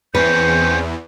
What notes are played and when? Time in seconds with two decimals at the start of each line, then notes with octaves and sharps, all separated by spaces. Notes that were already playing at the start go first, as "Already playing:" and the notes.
0.15 E2 C4 C#4 B4 G6